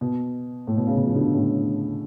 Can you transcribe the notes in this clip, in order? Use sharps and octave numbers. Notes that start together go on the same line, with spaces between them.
B2
A2
B2
C#3
B2
F3
B2 D3
A2 C#3